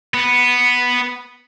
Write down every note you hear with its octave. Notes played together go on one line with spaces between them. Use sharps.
B3